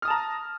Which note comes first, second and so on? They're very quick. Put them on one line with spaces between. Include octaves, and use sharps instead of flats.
F6 D#6 A5 A#5